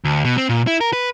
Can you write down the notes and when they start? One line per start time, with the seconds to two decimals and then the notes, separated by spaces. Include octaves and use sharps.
0.05 D2
0.25 B2
0.38 C4
0.49 A#2
0.67 E4
0.81 A#4
0.93 B4